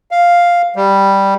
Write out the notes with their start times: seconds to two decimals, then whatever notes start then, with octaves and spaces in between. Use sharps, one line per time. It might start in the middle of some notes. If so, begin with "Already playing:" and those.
0.11 F5
0.76 G3